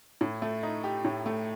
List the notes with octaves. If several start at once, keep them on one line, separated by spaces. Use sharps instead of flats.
A2
A3
D#4
G4
A2
A3